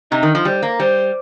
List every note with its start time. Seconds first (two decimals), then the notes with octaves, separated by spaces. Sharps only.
0.11 C3 D#4
0.23 D#3
0.35 F3
0.45 G3 C5
0.62 A#3
0.80 G3 C5